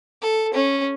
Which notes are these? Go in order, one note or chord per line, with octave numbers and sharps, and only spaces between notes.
A4
C#4